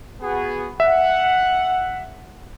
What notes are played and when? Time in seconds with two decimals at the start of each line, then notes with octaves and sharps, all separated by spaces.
0.22 B3 F#4 G#4
0.80 E5 F#5